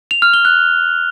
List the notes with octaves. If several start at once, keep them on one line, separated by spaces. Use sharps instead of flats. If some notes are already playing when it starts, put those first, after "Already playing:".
F7
F6
G7
F#6